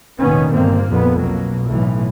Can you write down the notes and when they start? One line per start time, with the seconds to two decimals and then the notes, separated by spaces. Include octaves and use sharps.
0.21 F1 D#2 A#2 D#3 B3 C#4
0.54 G1 A#3 C4
0.90 A#1 F2 B3
1.20 B1 B2 F#3 A#3
1.67 B1 A2 E3